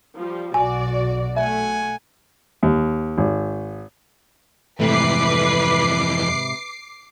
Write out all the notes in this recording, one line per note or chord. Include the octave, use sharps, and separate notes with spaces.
F3 G3
B1 F#4 D5 G#5
A3 E5 F#5 G#5
D#2
G#1
F2 G#2 C3 E3 A3 B4 D6 C7